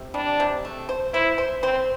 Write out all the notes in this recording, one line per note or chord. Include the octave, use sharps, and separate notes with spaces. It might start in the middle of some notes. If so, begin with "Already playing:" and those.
Already playing: C3
G3 D4
C3
A3
C5
E4 C5
C5
C4 C5